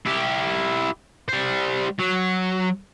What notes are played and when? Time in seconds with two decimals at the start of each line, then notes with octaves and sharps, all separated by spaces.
0.06 E4 G4
1.29 G3 C5
1.99 F#3